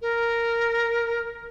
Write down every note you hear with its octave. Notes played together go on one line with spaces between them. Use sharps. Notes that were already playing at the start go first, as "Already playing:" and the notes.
A#4